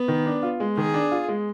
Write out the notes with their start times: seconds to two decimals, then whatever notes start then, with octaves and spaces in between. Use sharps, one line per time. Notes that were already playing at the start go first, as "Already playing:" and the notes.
Already playing: B3
0.08 D#3
0.26 D4
0.43 F4
0.60 G#3
0.77 D#3 G#4
0.94 D4
1.11 F4
1.28 G#3